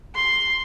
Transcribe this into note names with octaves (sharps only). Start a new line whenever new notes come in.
C6